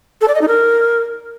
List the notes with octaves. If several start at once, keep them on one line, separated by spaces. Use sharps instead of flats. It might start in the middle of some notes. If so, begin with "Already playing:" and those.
A4
D5
D#5
D#4
A#4